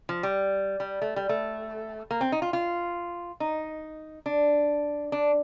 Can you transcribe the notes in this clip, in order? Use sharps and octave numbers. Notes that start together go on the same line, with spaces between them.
F3
G3
G3
A3
G3
A3
A#3
C4
D#4
F4
F4
D#4
D4
D4